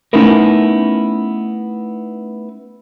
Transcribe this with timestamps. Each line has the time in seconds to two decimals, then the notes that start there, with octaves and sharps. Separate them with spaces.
0.13 A3 B3 C#4 D#4 E4 A#4